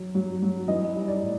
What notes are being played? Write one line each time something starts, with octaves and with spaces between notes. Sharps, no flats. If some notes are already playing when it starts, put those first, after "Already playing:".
Already playing: F#3
F#3
F#3
E3 D#5
G3
D5
A2